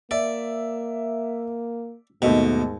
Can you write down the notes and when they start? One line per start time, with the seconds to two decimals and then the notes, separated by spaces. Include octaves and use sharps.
0.11 A#3 D5 E5
2.22 D#2 G#2 B2 A3 D#5